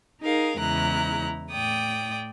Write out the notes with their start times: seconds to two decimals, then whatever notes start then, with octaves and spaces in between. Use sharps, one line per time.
0.22 D#4 G#4 A#4 F5
0.58 E2 C#3 G#3 E4 A#5 F#6
1.50 A2 D5 G5 D#6